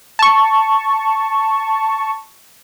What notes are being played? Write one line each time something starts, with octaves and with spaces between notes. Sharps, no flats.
A5 C#6